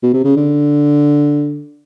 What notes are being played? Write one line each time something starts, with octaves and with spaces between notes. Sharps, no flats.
B2
C3
C#3
D3